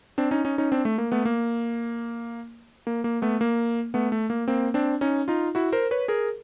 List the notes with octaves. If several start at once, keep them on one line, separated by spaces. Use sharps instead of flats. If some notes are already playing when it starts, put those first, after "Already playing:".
C4 D4
C#4 D#4
C#4 D#4
C#4 D#4
C4 D4
A3
A#3
A3 B3
A#3
A#3
A#3
A3 B3
A#3
A3 B3
A3
A#3
A#3 C4
C4 D4
C#4 D#4
D#4 F4
E4 F#4
A#4 C5
B4 C#5
G#4 A#4